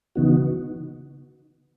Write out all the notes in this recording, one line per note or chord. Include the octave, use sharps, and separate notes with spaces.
C#3 E3 B3 D#4 F#4